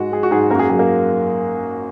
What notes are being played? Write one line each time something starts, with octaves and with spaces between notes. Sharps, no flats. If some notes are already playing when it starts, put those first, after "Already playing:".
Already playing: G#2 G#3 F#4
G#3 G#4
F#4
G#2 G#4
F#2 A#3 F#4 A#4
G#4
F#3 G#4
A#3 A#4